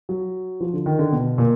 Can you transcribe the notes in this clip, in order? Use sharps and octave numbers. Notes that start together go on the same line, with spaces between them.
F#3
F3
D3
D#3
D3
B2
A#2